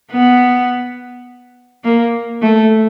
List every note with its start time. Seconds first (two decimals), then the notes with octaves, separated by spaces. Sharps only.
0.12 B3
1.84 A#3
2.42 A3